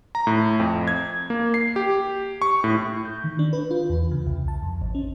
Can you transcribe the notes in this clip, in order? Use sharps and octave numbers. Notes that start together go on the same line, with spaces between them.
A#5
A2
F2
G#6
A#3
C7
G4
C#6
A2
G6
D#3
D4
B4
F4
E2
C#3
C2
A5
F2
G#1
C#4